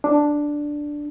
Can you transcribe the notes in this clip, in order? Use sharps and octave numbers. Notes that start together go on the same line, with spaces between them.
D4